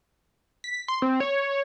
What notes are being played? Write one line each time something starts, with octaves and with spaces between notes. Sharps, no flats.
B6
C6
C4
C#5